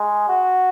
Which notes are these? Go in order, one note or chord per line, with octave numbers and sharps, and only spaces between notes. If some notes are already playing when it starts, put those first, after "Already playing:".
Already playing: G#3
F#4